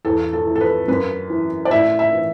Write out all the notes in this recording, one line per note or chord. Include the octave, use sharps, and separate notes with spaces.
E2 A4
A4
E3
A4
B4
F#2 B4
E3
D5
A2 E5
E5
E3